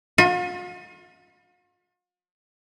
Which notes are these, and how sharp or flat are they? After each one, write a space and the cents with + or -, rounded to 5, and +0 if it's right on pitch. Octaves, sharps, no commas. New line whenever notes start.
F4 +45